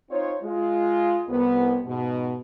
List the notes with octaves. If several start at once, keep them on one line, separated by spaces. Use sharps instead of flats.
C4 D#4 F4 C5 C#5
G#3 F4
C2 B3
G#2 B2